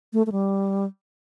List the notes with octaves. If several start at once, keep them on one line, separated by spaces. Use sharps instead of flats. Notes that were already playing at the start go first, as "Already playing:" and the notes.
A3
A3
G3